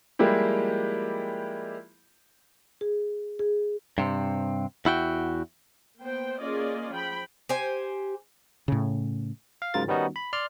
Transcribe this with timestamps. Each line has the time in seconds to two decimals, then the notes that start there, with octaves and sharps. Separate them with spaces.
0.19 F3 G3 G#3 A#3 E4 G4
2.81 G#4
3.39 G#4
3.98 G2 C3 C4
4.85 E2 E4 F#4 G5
5.99 A#3 B3 C5 G5
6.39 A#3 C#4 F4 G#4 D5 D#5
6.93 F3 G5 B5
7.49 G4 C5 G#5
8.68 A2 C#3
9.62 F5
9.74 G#2 C#3 F#3 F4 A#4 A6
9.88 D#3 G3 B3 C#4 D#4 F#4
10.16 B5
10.33 D5 C6 F6